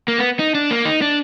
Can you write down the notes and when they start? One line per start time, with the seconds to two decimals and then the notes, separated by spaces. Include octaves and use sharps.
0.08 A#3
0.18 B3
0.39 D#4
0.55 D4
0.71 A#3
0.85 D#4
1.02 D4